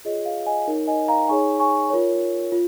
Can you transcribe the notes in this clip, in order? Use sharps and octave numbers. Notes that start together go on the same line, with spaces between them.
F4 G#4 C#5 D#5
F5
D#5 G#5
D#4 A#4 C#5
D#5 G#5
F5 A#5
D#4 G#4 C#5 G#5 C#6
G#5 C#6
F4 A#4 C#5
F4